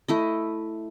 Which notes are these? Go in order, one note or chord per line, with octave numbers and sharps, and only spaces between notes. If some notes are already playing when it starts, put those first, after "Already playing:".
A3 E4 D#5